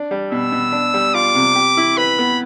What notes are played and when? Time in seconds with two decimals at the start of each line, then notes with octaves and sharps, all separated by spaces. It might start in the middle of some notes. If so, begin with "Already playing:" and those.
Already playing: D4
0.11 G3
0.31 B2 E6
0.52 B2
0.72 D4
0.94 G3
1.14 F4 D6
1.35 C3
1.55 G4
1.77 E4
1.97 B4 B5
2.19 B3